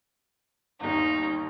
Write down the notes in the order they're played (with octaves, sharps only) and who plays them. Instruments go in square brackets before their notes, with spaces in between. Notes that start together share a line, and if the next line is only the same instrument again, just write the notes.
[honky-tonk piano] G1 D#2 [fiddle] D#4